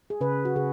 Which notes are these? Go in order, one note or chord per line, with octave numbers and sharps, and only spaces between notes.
G#4
C#3 B4
F#4
C#3 G#4